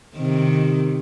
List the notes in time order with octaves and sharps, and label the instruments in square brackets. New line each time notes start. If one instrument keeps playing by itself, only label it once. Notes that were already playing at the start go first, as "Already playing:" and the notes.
[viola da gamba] C3 D#3